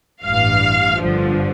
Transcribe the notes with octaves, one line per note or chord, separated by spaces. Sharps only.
A1 G2 E3 F5
G1 G2 D3 F3